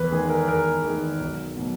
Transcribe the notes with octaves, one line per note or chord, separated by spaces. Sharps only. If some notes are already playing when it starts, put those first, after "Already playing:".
Already playing: E2 B4
D#3 G#3 G#4
A#4
E2 A#4
D#3 G#3
B1
B2 F#3